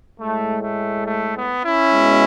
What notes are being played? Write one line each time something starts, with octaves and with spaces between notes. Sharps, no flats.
A2 G#3 A3
A3
A3
B3
C#4 E4
B2 G#3